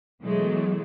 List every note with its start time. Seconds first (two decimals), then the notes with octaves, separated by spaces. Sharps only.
0.22 B2 E3 F#3 G#3 A3